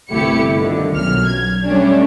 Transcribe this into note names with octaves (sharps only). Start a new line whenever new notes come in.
G1 C2 A3 E4 G4 C#7
D3 D#3 F3
B1 F#2 F#3 F6
G#6
G3 A3 C#4 D4